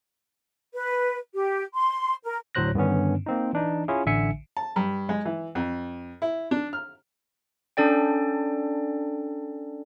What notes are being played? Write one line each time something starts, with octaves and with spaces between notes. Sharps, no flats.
B4
G4
C6
A#4
D2 A2 F#3 C5 F#6 A#6
G2 D3 D#3 B3 C#4
A#3 C4 D#4
E3 D4 D#4
C#4 E4 F4 G#4
A1 D3 E5 G#5 C#7
A5
G2
G#3
E3
F2
E4
D4
F6
C#4 D4 A4 D5 G5